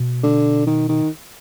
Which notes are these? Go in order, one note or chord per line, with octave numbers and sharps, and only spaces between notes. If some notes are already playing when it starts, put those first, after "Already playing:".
Already playing: B2
D3
D#3
D#3